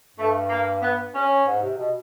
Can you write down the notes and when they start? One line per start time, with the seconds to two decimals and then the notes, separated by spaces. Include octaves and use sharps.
0.17 G2 A3
0.49 A#3
0.82 B3
1.14 C#4
1.47 G#2
1.62 C3
1.78 B2